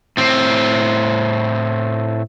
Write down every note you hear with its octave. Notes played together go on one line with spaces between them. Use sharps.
A2 C4